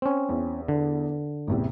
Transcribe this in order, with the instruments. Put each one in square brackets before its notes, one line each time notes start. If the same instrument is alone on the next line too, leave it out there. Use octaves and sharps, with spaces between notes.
[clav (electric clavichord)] C4 C#4
[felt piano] E2
[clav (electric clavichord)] D3
[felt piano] A1 E2 C3